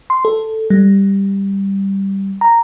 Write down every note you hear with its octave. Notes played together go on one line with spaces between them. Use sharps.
C6
A4
G3
A#5